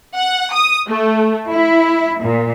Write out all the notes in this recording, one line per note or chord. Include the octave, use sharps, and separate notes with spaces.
F#5
D#6
A3
E4
A#2